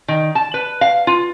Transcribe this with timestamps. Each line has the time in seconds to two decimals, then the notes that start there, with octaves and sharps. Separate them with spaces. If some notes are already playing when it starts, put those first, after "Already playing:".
0.08 D#3
0.35 A5
0.54 B4
0.81 F5
1.07 F4